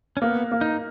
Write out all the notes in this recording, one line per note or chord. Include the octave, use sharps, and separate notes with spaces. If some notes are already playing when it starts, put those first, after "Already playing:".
C#4
A#3 B3
A#3
D#4